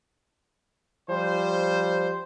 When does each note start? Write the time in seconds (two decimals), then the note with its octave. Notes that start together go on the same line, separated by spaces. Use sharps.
1.09 F3 G3 C5